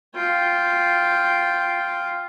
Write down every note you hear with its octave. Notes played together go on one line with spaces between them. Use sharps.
F4 G5